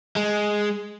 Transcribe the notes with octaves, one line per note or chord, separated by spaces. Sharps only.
G#3